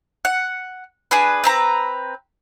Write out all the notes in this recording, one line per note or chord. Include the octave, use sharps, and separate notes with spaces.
F#5
D4 G#4 B4
C4 B4 A#5